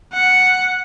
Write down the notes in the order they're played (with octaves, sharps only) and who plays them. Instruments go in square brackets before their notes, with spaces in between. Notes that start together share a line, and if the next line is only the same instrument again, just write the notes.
[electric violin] F#5